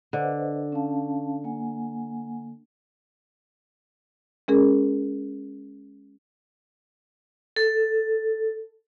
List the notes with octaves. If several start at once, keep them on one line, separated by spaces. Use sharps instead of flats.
D3 B4 C5 D#5
C#4 F5 A5
A#3 F#5 G#5
G#3 C#4 G#4 A#4
A4